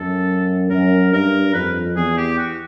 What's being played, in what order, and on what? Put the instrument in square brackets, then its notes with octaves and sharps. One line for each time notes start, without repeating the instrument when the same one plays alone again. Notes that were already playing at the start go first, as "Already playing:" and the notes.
Already playing: [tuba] F#2 [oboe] A4
[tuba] F#2 [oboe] A#4
[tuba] G2 [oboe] A#4
[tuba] F2 [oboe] B4
[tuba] E2 [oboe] G#4
[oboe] G4
F#4